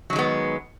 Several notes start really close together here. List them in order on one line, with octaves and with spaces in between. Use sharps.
F#3 D#3 G#3 B3